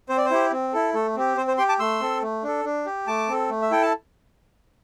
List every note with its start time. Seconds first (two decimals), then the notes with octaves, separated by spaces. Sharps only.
0.09 C4 C5
0.17 D5
0.25 C5
0.31 E4 G4
0.52 C4
0.73 E4 A4
0.94 A3 A4
1.16 C4 G4
1.37 C4 C5
1.48 C5
1.58 G4 G5 C6
1.69 A5 D6
1.79 A3 C6 E6
2.00 C4 A4
2.22 A3
2.43 D4 A4
2.65 D4
2.86 G4
3.07 A3 A5 D6
3.28 C4 A4
3.50 A3
3.62 E5
3.71 E4 A4 G5
3.82 A5